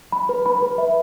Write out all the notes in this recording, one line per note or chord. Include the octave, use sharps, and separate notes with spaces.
B5
B4
B5
B4
E5